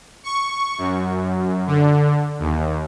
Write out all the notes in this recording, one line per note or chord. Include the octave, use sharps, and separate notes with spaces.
C#6
F#2
D3
D#2